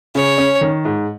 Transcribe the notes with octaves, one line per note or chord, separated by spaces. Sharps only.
C#3 C#5
C#4
D#3
G#2